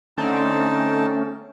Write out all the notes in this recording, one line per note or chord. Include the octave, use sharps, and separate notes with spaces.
D3 A3 C4 C#4 D#4 A5